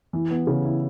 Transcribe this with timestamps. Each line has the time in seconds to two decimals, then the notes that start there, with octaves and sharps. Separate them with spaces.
0.13 E3
0.30 B3
0.47 C#3
0.65 E4